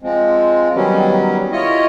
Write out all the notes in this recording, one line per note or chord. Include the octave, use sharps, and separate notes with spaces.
F3 G#3 C4
D#3 F#3 G3 B3 C#4
E4 F4 C#5 D#5